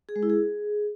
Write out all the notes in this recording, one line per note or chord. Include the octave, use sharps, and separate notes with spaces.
G#4
G#3
E4
G#4